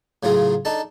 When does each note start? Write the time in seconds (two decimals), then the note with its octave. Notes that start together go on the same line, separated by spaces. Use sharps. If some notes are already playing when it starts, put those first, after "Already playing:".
0.23 A2 C#3 F#3 F4 G#4
0.65 D4 D#4 A4 A5